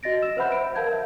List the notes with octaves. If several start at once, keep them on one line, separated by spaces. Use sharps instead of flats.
F#4 D#5 A6 A#6 D7
E6 E7
B4 C5 E5 F#5 B5 G6
D7
A#4 F5 A5 G6 G#6
E5